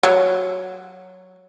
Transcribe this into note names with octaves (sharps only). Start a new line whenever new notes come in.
F#3